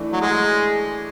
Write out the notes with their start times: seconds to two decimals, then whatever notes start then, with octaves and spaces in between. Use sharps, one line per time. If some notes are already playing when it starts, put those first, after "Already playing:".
Already playing: E3 A3 D4
0.12 F#3
0.21 G#3